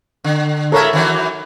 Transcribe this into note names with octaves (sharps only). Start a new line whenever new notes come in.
D3
A2 G#3 A4 A#4 C#5 E5
D#3 E3 F#3